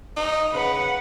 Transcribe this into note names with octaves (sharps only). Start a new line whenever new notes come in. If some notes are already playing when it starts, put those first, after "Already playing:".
D#4
C#3 B4 F#5